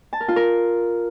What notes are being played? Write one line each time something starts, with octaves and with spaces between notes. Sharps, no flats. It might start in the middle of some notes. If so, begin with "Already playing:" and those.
A5
A#4
F4
A#4